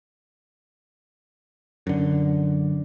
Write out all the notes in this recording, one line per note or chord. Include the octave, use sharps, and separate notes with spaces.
F#2 D3